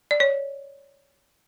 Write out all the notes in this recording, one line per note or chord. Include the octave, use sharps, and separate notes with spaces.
D5
C#5